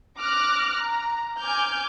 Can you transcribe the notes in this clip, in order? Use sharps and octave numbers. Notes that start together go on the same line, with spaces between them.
D6 F6 F#6 A#6
A#5
G#5 D6 F6 G6